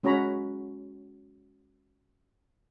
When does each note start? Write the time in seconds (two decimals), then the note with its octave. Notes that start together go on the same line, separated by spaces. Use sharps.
0.03 G#3 C#4 F#4 C#5 A#5 B5